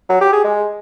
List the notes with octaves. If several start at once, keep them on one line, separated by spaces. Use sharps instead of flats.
F#3
G4
G#4
G#3